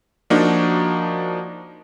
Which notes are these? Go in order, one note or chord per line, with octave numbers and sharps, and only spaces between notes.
F3 A#3 D4 D#4 F#4